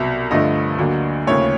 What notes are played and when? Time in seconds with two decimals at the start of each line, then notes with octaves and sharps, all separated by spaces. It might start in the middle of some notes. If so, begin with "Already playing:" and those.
Already playing: C2 B2 F#3 E5
0.31 G2 D3 F3 A3 D#5
0.78 D2 D3 F#3 A#3
1.27 D#2 C#3 F3 A3 C#5